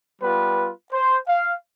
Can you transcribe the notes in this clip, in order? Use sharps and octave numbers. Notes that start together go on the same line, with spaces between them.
G3 B3 F4 B4
C5
F5